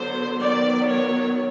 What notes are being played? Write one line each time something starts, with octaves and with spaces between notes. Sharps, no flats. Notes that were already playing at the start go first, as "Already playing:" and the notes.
Already playing: D3 F#3 B3 C5
D#3 F#3 B3 D5
C#5